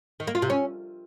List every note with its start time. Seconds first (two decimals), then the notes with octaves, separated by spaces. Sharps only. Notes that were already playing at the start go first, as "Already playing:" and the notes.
0.20 D#3
0.27 A#3
0.35 F4
0.42 C3
0.50 C#4